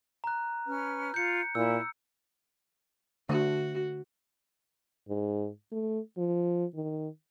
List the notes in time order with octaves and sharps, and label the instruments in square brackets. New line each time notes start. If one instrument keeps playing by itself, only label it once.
[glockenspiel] A#5 F#6
[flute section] C#4 B4 F6
[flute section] F4 [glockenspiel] G6 C#7
[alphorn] A#2 [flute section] E4 [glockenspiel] E6
[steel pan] D3 A3 C5 [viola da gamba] F#4
[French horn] G#2
A3
F3
D#3